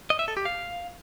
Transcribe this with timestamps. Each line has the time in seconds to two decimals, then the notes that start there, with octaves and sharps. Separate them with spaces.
0.10 D#5
0.19 E5
0.28 A4
0.37 G4
0.45 F5